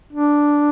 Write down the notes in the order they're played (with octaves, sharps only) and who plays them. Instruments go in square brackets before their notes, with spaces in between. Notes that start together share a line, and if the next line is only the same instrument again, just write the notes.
[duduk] D4